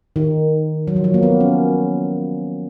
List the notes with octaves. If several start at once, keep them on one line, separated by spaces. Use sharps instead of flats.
D#3
F#3
F3
F#3
A#3
B3
C#4